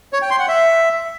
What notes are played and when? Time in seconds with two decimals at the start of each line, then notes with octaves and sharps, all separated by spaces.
0.13 C#5
0.22 G5
0.31 C6
0.39 F#5
0.48 E5